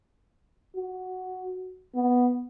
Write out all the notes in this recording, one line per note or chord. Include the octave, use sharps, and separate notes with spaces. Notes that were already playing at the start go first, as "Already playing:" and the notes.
F#4
B3